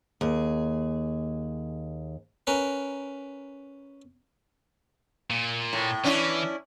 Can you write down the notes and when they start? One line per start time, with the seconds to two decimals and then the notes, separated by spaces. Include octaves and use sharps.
0.21 D#2 G#4
2.47 C#4 A#4 B4
5.30 A#2
5.73 A2
6.04 E3 C#4 D4 E4